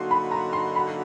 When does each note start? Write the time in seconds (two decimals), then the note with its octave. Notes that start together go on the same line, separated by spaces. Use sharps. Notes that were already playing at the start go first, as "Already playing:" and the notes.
Already playing: D3 F#3 A#3 D#4 F#4 C6
0.11 B5
0.31 A#5
0.53 C6
0.76 B5